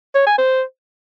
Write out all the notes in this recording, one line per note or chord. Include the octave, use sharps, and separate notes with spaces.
C#5
G#5
C5